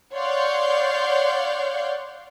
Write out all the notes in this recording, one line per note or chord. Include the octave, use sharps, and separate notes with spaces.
C#5 D5 F5 F#5 C6 G6